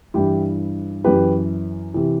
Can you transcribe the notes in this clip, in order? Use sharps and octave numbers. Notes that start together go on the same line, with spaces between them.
G2 E3 E4 G4
F#2 E3 G4 B4
C3 E3